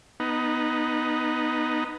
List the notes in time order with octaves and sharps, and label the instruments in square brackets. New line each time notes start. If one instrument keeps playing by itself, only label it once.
[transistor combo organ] B3 D#4